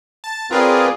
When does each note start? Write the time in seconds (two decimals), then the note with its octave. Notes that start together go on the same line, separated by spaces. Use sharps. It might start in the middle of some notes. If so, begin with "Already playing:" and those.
0.24 A5
0.51 C4 F4 G#4 A#4 B4 D5